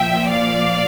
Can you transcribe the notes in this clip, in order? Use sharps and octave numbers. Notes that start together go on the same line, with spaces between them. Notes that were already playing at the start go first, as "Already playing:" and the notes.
Already playing: A#2 F3 E5 G5
D5 F5